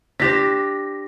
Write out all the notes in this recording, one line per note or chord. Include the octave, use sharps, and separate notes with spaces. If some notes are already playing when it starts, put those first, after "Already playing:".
D4 G4 C5 A#6 B6